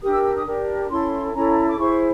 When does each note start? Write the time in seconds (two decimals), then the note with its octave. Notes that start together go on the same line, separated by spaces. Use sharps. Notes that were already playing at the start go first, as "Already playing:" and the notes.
0.02 D4 G4 A#4 D#6
0.13 E6
0.24 E6
0.36 D#6
0.46 D4 G4 A#4
0.90 C#4 E4 A4 C6
1.34 C#4 E4 A4 A#5
1.68 D6
1.79 E4 G#4 C5 C#6